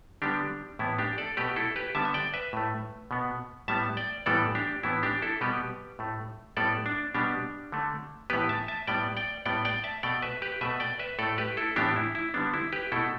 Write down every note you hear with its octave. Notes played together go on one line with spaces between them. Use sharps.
D3 G3 B3 D4 G4
A2 E3 B3 E4
D4 G4
A4 D5
B2 A3 G4 B4
E4 A4
G4 B4
D3 G3 B3 E5 A5
E5
D5 G5
B4 E5
A2 A3
B2 B3
A2 G3 B3 E5 A5
D5 G5
A2 E3 G3 B3 A4 D5
D4 G4
A2 E3 B3 E4
D4 G4
E4 A4
B2 G3 B3 G4 B4
A2 A3
A2 G3 B3 A4 D5
D4
B2 G3 B3 D4 G4
D3 A3
A2 E3 B3 G4 B4
E5 A5
E5 A5
A2 G3 B3 D5 G5
D5 G5
A2 G3 B3 D5 G5
D5 G5
E5 A5
B2 A3 D5 G5
B4 E5
G4 B4
B2 A3 B4 E5
D5 G5
B4 E5
A2 A3 A4 D5
G4 B4
E4 A4
A2 E3 B3 D4 G4
E4
E4
D3 G3 B3 D4
E4
G4 B4
B2 A3 E4 A4